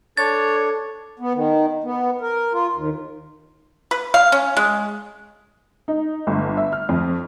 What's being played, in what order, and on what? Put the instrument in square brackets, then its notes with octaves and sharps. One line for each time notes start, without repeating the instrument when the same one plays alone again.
[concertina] D4 [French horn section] A4 [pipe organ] C#5 [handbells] A6
[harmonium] B3
D#3
B3
A#4
F4
D#2
[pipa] B4
F5
C#4
G#3
[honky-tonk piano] D#4
G1
E5
F6
F2